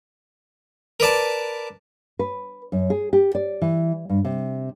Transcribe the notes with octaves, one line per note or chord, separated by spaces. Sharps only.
A#4 B4 D5 A5
B4
F#2
G#4
G4
D5
E3
G2
C3